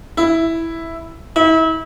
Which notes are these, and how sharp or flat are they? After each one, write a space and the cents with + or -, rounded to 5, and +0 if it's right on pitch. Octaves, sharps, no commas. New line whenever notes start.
E4 +0
E4 -35